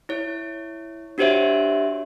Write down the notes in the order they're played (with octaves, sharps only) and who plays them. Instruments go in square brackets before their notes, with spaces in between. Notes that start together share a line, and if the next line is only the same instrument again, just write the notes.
[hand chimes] E4 C#5
D4 F#4 G4 C5 C#5 E5